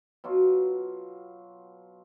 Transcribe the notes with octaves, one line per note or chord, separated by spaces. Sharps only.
B2 F#3 F4